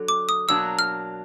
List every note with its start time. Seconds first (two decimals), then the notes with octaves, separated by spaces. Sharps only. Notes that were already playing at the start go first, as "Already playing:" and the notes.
Already playing: D3 F#3
0.08 D6
0.29 D#6
0.49 B2 F#3 A#3 D4 E6
0.79 F6